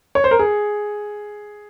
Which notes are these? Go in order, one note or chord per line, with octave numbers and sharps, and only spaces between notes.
C#5
C5
A#4
G#4